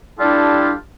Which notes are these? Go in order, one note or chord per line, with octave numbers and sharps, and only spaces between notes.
G3 D4 E4 F4 G4 A4